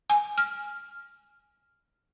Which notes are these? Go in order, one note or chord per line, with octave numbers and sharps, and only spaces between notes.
G#5
F6